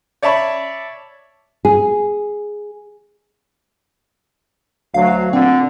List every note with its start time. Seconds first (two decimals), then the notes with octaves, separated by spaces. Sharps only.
0.22 C#5 D5 E5 A5 B5 C#6
1.65 G#4
4.94 D2 F#3 F5
5.33 A#2 D3 C4